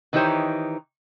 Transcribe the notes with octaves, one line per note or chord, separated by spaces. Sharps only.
D#3 E3 D#4 G4 C5 C#5